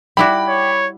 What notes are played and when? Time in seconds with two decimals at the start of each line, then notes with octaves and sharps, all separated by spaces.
0.17 G3 E4 F#4 G5 B5 D6
0.48 C#5